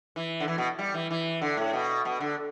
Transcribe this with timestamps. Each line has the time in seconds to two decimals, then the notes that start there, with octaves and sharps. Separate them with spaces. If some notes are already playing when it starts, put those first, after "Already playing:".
0.16 E3
0.40 D3
0.48 E3
0.58 B2
0.79 G3
0.94 E3
1.11 E3
1.41 D3
1.57 A2
1.73 B2
2.05 B2
2.20 D3